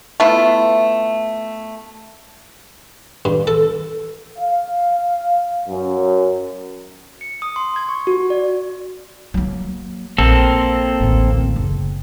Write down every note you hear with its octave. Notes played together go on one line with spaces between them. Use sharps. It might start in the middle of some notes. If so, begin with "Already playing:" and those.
A3 B3 E4 F4
G2
A4
F5
F#2
C#7
D#6
C6
G#6
C#6
F#4
D5
F#3 A#3
A#1 A#3 C4 A4
A1 D2
F#1